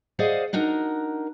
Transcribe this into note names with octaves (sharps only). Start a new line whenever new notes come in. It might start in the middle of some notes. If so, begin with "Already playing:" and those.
G#4 C5 D5 D#5 F5 F#5
D4 D#4 F#4 A#4